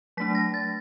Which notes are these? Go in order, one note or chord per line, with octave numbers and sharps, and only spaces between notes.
F#3 A3 D4 B6
A#6
A6